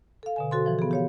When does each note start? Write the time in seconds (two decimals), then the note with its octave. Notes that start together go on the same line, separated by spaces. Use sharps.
0.23 A4 F5
0.36 B2 D3 G#5
0.51 F#4 A4 C5 C6
0.66 E3 F3
0.79 B3 G#4
0.91 G4 C#5 F5